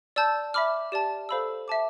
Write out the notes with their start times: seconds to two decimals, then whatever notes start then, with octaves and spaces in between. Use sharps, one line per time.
0.16 D5 A5 E6 G6
0.54 E5 B5 D6 F6
0.92 G4 D5 A5
1.29 A4 C5 F5 B5 E6
1.68 E5 A5 D6